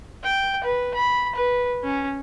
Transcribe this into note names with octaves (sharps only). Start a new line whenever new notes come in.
G5
B4
B5
B4
C#4